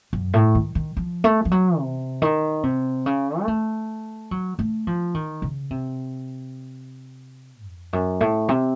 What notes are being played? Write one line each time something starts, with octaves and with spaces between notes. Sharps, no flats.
F#2
A2
D#3
D#3
F3
A3
F3
F#3
C3
D#3
C3
C#3
A#3
A3
F#3
A3
F3
D#3
C#3
C3
F2
F#2
A2
C3